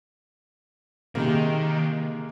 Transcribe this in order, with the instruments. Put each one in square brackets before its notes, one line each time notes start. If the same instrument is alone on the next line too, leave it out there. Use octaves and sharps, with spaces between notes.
[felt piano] C3 [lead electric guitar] D#3 [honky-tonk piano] G#3 A#3